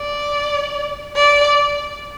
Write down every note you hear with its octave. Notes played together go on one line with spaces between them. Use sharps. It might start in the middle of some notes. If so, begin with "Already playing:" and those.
Already playing: D5
D5